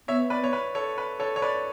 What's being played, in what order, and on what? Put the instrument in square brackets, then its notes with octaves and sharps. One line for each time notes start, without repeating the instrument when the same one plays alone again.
[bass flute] B3 [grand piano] C#5 E5
[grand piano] B4 D5
C#5
B4
A4 C#5
B4
A4 C#5
C#5
B4 D5